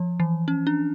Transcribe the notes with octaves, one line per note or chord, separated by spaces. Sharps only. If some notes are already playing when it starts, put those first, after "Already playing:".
Already playing: F3
E3
C#4
D4